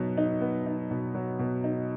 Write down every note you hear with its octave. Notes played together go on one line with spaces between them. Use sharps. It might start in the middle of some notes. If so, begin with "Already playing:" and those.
Already playing: B2 F#3 B3 D#4
D#4
B3
D#4
B2
F#3
B2
D#4